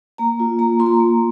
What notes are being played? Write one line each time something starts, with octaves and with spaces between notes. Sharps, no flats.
A#3 A#5
F4
A#3 A#5
F4 C6
A#5
A#3